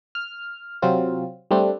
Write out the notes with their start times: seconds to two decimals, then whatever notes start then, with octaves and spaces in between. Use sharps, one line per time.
0.15 F6
0.82 C3 F#3 C4 F4
1.51 G3 A3 C4 D4